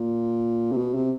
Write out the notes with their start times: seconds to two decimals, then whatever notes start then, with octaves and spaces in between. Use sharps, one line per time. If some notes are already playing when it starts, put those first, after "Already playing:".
Already playing: A#2
0.72 C3
0.77 B2
0.94 C3